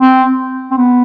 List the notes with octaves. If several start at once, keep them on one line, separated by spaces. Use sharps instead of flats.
C4
C4
B3